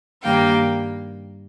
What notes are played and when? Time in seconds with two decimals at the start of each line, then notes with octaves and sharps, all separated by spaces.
0.24 G2 D#3 G3 A#3 F5 G5